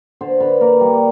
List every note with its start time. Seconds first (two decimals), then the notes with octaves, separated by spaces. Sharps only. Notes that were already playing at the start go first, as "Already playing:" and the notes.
0.21 D3 C5
0.40 D3 B4
0.61 A#3 A#4
0.81 G3